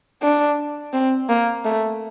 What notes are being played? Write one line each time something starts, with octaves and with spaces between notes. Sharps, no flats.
D4
C4
A#3
A3